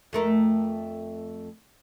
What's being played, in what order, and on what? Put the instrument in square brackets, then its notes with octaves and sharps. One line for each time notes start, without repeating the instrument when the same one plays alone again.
[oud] F2 A3 A#4